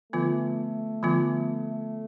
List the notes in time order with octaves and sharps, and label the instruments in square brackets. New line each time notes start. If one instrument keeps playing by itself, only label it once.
[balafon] D3 F3 B3 F4 [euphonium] A3
[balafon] D3 F3 B3 F4